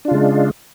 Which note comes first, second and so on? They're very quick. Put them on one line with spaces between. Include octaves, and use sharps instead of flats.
D4 F4 C#3 G#3